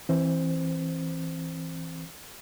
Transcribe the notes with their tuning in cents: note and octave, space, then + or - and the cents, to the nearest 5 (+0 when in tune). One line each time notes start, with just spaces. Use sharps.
E3 +0 C4 +30 C5 +0